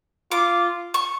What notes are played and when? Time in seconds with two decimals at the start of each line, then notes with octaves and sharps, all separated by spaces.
0.32 F4 D6
0.94 C#6